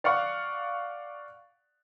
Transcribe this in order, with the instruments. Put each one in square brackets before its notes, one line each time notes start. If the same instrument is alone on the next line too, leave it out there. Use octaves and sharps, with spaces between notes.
[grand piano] D5 F5 F#5 C#6